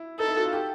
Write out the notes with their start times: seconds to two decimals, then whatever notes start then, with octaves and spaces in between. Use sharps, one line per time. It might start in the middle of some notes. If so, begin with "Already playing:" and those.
Already playing: E4
0.19 D#4 A4
0.28 E4
0.36 F#4
0.44 F4
0.53 G4